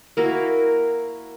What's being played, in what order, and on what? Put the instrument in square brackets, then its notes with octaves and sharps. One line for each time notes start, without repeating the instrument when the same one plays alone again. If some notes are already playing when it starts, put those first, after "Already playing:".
[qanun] A#3 E4 F#4 A#4